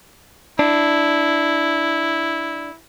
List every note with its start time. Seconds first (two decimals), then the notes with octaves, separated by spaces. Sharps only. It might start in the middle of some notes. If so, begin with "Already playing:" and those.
0.59 D4 E4